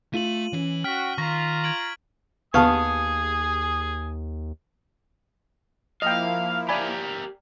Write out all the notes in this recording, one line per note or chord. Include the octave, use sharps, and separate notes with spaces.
A3 F4 D#7 F#7
E3 C#4
F#4 G5 F6 B6
D#3 F4 A#5 C#6 A#6
G#6 D7 F#7
D#2 B3 G4 F5 G#5 A5 C#6 D#6
F3 A#3 E4 D#5 F5 G5
G4 A#4 D5 G#5 B5